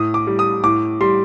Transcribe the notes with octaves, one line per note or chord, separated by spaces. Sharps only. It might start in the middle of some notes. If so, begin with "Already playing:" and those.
Already playing: A2 D#6
D6
G3
D#6
A2 D6
G3 C6